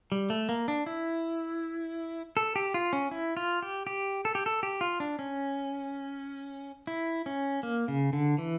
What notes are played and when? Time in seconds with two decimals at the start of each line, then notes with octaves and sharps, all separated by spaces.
0.12 G3
0.30 A3
0.49 A#3
0.68 D4
0.86 E4
2.37 A4
2.56 G4
2.74 F4
2.93 C#4
3.11 E4
3.37 F4
3.62 G4
3.87 G4
4.25 A4
4.35 G4
4.46 A4
4.63 G4
4.81 F4
5.00 D4
5.19 C#4
6.87 E4
7.26 C#4
7.63 A#3
7.88 C#3
8.13 D3
8.38 E3